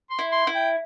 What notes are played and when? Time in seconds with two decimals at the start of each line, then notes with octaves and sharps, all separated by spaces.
0.11 C6
0.19 E4
0.32 C6
0.47 E4
0.55 G5